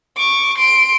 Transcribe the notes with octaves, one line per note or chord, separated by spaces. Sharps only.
C#6 D6
C6 D7